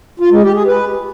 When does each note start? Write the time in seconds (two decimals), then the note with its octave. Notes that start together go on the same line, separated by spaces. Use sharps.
0.20 F4
0.31 G#3
0.43 G4
0.55 G#4
0.66 B4